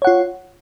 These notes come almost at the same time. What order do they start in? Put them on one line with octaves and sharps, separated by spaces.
C#5 F#5 F4